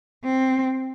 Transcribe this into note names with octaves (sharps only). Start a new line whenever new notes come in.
C4